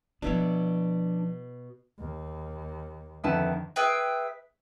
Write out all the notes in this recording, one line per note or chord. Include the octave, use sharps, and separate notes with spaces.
B2 F3 B3 D4 E4 C#5
D#2
F2 D3 D#3 E4 B4 A5
G#4 B4 E5 G5